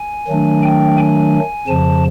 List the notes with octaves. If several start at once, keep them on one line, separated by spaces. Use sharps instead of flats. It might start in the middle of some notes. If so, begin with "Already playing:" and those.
Already playing: G#5
D#3 F#3 A3 D4
G5
G#5
F2 C#3 F3 A5